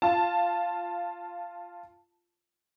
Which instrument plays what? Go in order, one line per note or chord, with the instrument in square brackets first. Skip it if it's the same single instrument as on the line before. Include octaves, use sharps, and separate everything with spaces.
[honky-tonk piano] F4 A5